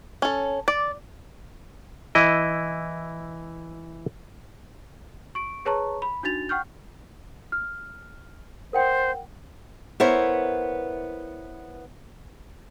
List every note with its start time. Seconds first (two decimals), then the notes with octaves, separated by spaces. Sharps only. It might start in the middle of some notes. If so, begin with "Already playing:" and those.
0.22 C#4 A4
0.68 D5
2.15 E3 E4 D#5
5.35 C#6 D7
5.65 G#4 B4 C#5 A5 A#5 C#6
6.02 B5
6.23 D4 D#4 F#4 A6 F7
6.49 F#5 G5 C#6 F6 G6
7.52 F6
8.73 A#4 C5 F#5 G5
10.00 B3 E4 A#4 C5 C#5